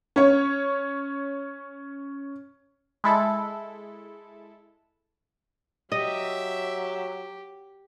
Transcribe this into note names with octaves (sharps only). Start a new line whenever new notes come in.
C#4 C#5
G#3 E4 A4
F#3 G4 D#5 E5